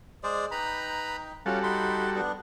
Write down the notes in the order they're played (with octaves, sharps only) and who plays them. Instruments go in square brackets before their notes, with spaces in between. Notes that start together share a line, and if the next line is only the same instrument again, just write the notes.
[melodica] G#3 D5 [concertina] G#4 C5
[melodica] D#4 G5 [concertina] B4 A#5 B5
[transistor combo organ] G3 F#4 A4 [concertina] C#4 F4
[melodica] D#4 B5 [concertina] C6
[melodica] B3 D4